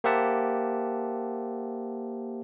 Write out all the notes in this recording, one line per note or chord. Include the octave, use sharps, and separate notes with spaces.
A#3 G4 C5 E5 F#5 A5